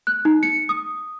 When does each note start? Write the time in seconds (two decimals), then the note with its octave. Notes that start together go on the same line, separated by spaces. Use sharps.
0.07 F#6
0.25 D#4
0.43 C#7
0.69 D#6